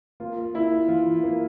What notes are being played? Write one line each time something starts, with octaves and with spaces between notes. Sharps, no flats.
A#3 F4
A#3 E4
E3 F4
A#3